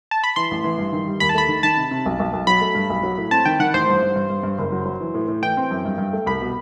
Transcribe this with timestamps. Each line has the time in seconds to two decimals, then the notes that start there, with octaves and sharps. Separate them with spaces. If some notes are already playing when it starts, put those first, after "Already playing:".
0.11 A5
0.24 B5
0.36 E3 C6
0.51 A1
0.64 E3
0.79 G2
0.93 D#3
1.07 G3
1.20 D#2 B5
1.29 A5
1.35 A3 B5
1.48 D#3
1.63 D#3 A5
1.77 C3
1.91 C3
2.06 B1
2.19 B1
2.33 B1
2.47 F#3 B5
2.61 A3
2.75 G2
2.90 B1
3.03 F#3
3.18 A2
3.31 C4 A5
3.45 D#3 G5
3.60 D#3 F#5
3.74 A1 C5
3.88 G2
4.02 G2
4.16 G2
4.30 G2
4.43 G2
4.58 F#1
4.72 F#3
4.86 F#3
5.00 E3
5.14 A2
5.28 A2
5.42 E3 G5
5.57 C4
5.71 F#2
5.85 G2
5.98 G2
6.13 A3
6.26 C2 B5
6.41 B2